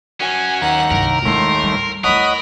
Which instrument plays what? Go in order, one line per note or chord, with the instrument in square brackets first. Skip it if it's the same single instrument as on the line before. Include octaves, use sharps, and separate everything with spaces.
[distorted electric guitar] F#2 C#4 [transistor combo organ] F#4 [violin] G#5
[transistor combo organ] D#2 A#5 [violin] F#5
[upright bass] C2 G2 [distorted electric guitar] A#4
[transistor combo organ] D#2 A2 [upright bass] G#3 F4 [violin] C6
[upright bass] G3
[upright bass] D2 E4 [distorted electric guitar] A#4 [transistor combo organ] C#5 D#5 F#5 [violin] B5 D#6